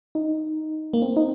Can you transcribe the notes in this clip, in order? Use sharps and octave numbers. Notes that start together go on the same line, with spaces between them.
D#4
A#3
C4
D#4